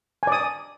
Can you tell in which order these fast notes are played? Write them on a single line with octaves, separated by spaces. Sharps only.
G#5 D5 D#6